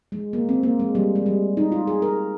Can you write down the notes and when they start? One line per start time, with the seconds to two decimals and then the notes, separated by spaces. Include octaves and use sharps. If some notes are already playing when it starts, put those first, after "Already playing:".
0.12 G#3
0.33 A#3
0.49 C4
0.63 A#3
0.79 G#3
0.95 G3
1.16 G#3
1.26 G3
1.57 D#4
1.72 F4
1.87 G#4
2.02 A#4